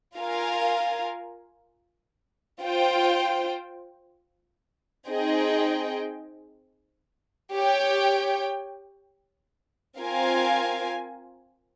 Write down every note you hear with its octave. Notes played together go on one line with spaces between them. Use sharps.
F4 A#4 F5 G#5
F4 C5 G5
C4 D#4 G#4 D#5 G5
G4 C#5 G5
C4 F4 A#4 F5 G#5